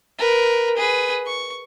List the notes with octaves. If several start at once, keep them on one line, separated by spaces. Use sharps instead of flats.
A#4 B4
G#4 B4
C#6